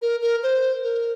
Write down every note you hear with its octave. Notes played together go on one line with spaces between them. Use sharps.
A#4
A#4
C5
A#4